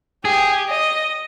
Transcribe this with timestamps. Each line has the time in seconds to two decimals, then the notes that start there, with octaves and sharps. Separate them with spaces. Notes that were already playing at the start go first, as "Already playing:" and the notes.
0.25 G4 G#4
0.69 D#5